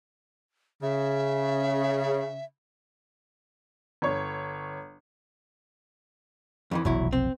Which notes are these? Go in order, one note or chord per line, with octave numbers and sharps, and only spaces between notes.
C#3 E5
G1 C#5
F2 D#3 E3
F1 B1 E2 F3 F#3 E4
C4